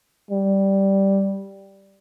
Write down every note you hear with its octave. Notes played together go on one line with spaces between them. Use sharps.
G3